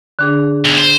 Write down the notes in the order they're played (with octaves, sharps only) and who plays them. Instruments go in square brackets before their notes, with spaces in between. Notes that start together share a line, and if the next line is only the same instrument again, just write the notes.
[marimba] D3 D4 G#4
[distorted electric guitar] B1
C5